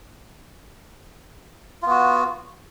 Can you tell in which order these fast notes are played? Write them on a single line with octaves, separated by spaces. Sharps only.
F4 B3 F#4